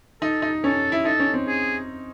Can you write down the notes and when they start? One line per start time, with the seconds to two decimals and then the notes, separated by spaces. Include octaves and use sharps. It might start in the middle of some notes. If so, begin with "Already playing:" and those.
0.22 D#4 A4
0.42 D#4
0.64 C#4 A4
0.92 E4
1.05 D#4 A4
1.19 C#4
1.34 C4
1.48 G#4